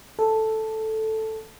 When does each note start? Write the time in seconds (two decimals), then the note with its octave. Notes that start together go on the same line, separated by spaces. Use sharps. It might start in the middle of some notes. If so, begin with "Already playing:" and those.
0.19 A4